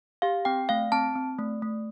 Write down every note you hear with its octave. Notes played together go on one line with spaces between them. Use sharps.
G4 F5
C4 G5
A3 F5
C4 A5
C4
A3
A3